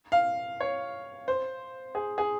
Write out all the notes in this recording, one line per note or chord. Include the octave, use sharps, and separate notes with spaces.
F5
C#5
C5
G#4
G#4